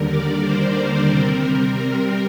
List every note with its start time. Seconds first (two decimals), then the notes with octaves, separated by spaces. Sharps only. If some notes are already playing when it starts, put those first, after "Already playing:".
Already playing: D#2 D3 G3 A#4
0.08 D5
0.42 C5
0.76 A#4
1.10 C3 G3 C4 A#4